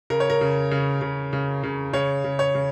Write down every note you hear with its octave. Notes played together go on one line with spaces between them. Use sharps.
C#3 A#4
C#5
A#4
C#3
C#3
C#3
C#3
C#3
C#3 C#5
C#3
C#5
C#3